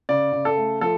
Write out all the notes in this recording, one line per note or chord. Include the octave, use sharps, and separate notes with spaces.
C#3 D5
C#3
A4
A3
F3 A4